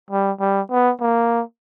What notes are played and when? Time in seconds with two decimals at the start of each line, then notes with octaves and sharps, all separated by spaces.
0.11 G3
0.41 G3
0.71 B3
1.01 A#3